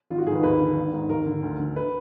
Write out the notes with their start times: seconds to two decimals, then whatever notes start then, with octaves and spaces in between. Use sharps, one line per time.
0.10 G#1 F4
0.18 F#4
0.26 G#2 G#4
0.31 D#3 B4
0.43 D#2 B4
0.60 D3
0.76 G#1
0.92 G#2 D#3
1.09 D#2 A#4
1.26 D3
1.42 D2
1.59 D3
1.76 B4